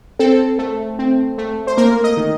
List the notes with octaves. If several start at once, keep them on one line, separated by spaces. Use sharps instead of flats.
C4 A4
A3
C4
A3
C5
A#3 A#4
D#5
D#3